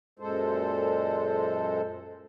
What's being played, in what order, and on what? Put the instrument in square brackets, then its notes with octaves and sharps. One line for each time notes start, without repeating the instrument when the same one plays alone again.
[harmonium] F#2 A#2 G#3 A4 C5